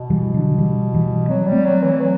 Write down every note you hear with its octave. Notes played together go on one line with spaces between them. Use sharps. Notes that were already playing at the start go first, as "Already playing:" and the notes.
Already playing: B2
E3 G3
D3 F#3
E3 G3
E3 G3
F#3 C4
G3
A3 C4
F#3
E3
F#3